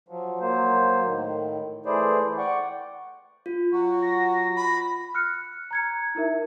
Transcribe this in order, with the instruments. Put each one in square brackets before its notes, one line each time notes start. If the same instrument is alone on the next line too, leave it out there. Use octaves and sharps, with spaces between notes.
[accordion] F3 F#3
F#3 A#3 C5
A2 D#3
E3 A3 E4 G#4 C5 D5
D5 F#5 G5 C#6
[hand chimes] F4
[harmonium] F#3 F#4
[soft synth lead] A#6
[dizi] B5
[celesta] F6 F#6 C#7
A#5 G#6 C#7
D#4 E4 A#4 E5